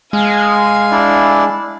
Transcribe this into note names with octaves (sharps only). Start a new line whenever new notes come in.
G#3 F5 G#5
D4 E4 D5